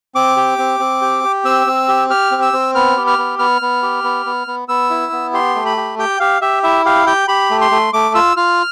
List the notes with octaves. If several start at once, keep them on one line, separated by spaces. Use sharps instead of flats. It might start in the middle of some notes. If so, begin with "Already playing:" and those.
C4 D6
G4
C4
C4
G4
G4
C4 E6
C4
G4
G4 F6
C4
E6
C4
B3 F6
G4
F6
B3
B3 F6
B3
G4
B3
B3
B3
B3 E6
E4
B3
G4 C6
A3
B5
G4
G4 G5
G4 F5
G4 E5
E4 E5
G4 F5
G4 G5
G4 B5
A3
C6
A3
A3 D6
F4 E6
F4 F6